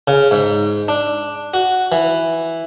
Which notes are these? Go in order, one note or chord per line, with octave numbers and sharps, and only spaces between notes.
C#3
G#2
D4
F#4
E3